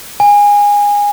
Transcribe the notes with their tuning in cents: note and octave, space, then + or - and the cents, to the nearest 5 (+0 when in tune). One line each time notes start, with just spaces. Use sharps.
G#5 -20